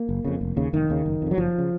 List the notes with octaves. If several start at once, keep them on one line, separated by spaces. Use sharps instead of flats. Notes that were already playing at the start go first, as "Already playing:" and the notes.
Already playing: A#3
F#1
F2 C#3
F1
D#2 C#3
F1 D#3
D#2 C#3
F#1
F2 C#3
F#3
F#1 F3
C#3